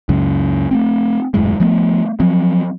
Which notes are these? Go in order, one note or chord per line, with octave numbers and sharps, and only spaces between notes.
C#2 F#2 C#3
A3 A#3 C4
D#1 F#2 A2 G#3
F3 A3 B3
F3 F#3 C4